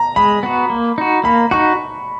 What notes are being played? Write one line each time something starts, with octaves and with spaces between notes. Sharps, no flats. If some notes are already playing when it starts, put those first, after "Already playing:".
Already playing: A#5
G#3 B5
B3 F#4
A#3
D#4 F#4
A#3 B5
D#4 F#4 C#6